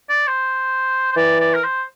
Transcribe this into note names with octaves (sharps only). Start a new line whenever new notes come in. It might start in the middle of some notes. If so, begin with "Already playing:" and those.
D5
C5
C5
E3 D5
D5
A#4
C5